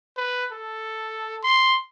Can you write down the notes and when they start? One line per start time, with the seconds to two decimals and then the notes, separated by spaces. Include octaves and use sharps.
0.17 B4
0.52 A4
1.43 C6